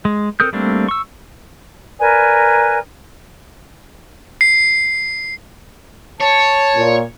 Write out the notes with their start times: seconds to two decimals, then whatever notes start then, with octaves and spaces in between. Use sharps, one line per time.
0.05 G#3
0.40 C4 A4 A#4 D#6 G6
0.53 G3 A3 A#3 C4 D4
0.89 C#6 E6
1.99 A#4 B4 D5 G#5
4.41 C7
6.21 C#5 A5
6.76 A#2